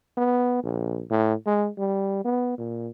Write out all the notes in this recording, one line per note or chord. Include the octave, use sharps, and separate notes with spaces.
B3
A#1
A2
G#3
G3
B3
A#2